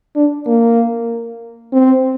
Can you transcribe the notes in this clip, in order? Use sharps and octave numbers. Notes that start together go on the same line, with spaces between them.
D4
A#3
C4